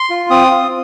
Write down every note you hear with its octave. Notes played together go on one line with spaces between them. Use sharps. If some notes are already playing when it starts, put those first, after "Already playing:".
Already playing: C6
F4
C4 D#6
F4